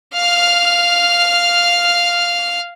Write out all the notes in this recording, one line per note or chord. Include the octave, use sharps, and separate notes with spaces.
F5 F6